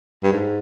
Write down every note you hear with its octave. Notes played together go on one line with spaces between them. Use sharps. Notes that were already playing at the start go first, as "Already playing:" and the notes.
G2
G#2